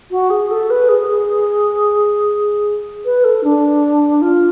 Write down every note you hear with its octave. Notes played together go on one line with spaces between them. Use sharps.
F#4
G#4
A4
B4
G#4
B4
A4
D4
F4